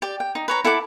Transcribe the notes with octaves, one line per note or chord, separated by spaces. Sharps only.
G4 D5
G5
D#4
B4 C#5 A#5
E4 A4 F#5 D6